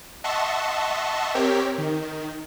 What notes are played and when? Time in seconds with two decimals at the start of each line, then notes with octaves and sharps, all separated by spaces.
0.24 D#5 E5 F#5 A5 C6 C#6
1.35 C4 G4 A#4 C#5 B6
1.78 D#3